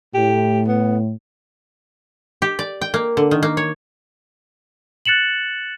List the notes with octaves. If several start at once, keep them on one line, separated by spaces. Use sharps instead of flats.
A2 G4
B3
G4
D5
G5
A#3
D3
D#3
A#3
C#5
F#6 A6 C#7 E7 F#7